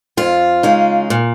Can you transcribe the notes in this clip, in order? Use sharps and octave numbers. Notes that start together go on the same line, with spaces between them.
F2 F4
C#3 G#3 D#4
A#2